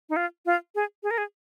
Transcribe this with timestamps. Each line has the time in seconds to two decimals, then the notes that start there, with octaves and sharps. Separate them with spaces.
0.09 D#4
0.16 F4
0.46 F4
0.75 G#4
1.03 G#4
1.11 A#4
1.18 G#4